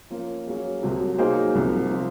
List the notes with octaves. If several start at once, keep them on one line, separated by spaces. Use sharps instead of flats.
F3 A#3 C#4 F4 A#4
F#3 A#3 C#4 G#4
C2 C3 F#3
F#3 A#3 D#4 G#4 C5
C2 C3 F3
F3 C4 F4